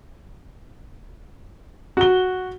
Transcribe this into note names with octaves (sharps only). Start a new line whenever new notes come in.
F#4 G7